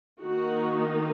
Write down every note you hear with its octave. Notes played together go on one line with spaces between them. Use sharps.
D#3 A#3 D#4 F#4